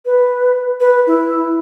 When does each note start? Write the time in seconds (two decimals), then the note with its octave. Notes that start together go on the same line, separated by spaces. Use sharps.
0.06 B4
0.80 B4
1.07 E4